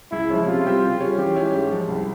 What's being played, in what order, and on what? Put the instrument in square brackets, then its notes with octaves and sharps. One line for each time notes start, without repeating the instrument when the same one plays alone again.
[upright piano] C#2 [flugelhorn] E4
[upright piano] C#3 F3 G#3 C#4
[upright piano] C3 [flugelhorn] F4
[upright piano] G3 C4 G4
C#3
G3 C#4
[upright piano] E3 [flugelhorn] G4
[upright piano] G#3 C#4 E4
G#2
F3 G#3
C2